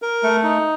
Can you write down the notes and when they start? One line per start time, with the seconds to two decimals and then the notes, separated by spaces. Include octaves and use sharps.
0.02 A#4
0.23 A3
0.43 D#4